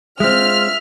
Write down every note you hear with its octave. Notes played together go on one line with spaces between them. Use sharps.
G#3 C4 F4 E5 F6